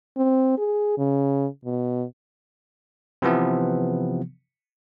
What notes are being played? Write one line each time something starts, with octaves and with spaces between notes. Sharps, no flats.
C4
G#4
C#3
B2
C3 E3 F3 B3